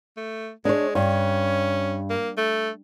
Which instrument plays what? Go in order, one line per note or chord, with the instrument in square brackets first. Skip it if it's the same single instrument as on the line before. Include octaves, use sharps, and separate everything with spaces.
[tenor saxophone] A3
[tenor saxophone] G#3 [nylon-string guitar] D4 C#5
[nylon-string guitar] G2 [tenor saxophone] C#4
[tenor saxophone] A#3
A3